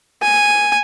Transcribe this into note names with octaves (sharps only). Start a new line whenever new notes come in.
G#5